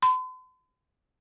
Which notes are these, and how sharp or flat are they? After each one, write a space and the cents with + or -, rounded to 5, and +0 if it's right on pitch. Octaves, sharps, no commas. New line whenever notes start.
C6 -45